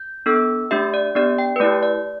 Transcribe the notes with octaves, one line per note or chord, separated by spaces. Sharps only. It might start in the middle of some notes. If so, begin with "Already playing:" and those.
Already playing: G6
B3 D4 A4 E6
A3 D4 G4 E5
D5
B3 D4 G4 D5
G5
B4
A3 E4 G4 D5
D5